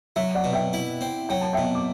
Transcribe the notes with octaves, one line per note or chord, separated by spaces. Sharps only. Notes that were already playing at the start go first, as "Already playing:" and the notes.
F#3 E5
D5 F#5
B2
E5 G5
E4
C4
F#3 G5
A5
B2 E5 G5
D6